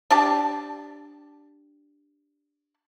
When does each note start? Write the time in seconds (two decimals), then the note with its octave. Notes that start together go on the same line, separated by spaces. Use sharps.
0.10 D4 G4 A5